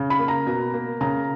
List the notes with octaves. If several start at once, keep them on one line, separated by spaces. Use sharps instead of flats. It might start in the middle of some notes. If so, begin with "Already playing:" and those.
Already playing: C#3
B5
A#3
A#5
B2
A#3
C#3 A#5